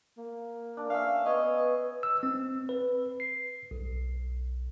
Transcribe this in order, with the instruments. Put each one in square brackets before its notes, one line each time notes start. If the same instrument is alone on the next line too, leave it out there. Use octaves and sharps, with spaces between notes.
[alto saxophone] A#3
[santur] D4
[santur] C#4 E5 [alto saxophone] F5
[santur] B3 C#5 [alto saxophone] D#5
[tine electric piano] E6
C4
B4
C7
B1